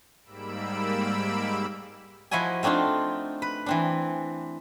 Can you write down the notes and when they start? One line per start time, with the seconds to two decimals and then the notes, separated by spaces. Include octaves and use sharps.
0.24 G#2 G3 A#3 B5 E6 D7
2.31 F3 E4 F#4 D#5 G#5
2.63 A3 C4 D4 D#4 F4
3.42 B4
3.66 E3 C4 D4